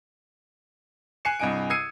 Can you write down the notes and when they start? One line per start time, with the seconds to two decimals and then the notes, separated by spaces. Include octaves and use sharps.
1.25 G#5 F#6 C7 C#7 E7
1.40 C2 G2 D#5 G#5 D7
1.70 D#6 E6 G#6 C7 C#7 D#7